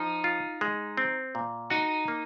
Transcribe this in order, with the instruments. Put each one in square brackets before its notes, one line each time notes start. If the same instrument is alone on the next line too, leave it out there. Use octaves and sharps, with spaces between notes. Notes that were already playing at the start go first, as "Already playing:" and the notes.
Already playing: [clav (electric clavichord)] F3 [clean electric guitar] D#4
[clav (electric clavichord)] F4
G#3
C4
A#2
[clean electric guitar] D#4 [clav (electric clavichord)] F#4
[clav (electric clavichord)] A#3